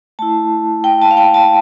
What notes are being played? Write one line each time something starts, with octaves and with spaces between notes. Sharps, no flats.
A3 E4 A5
G5
A5
F5
G5
A5